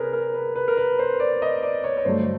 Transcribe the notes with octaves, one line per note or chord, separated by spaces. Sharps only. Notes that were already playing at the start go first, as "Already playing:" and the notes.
Already playing: C3 G#4 A#4 B4 C#5
A#4
B4
B4
A#4
B4
C5
D5
D#5
D5
C#5
C#5
G2 D3 F#3 A3 C5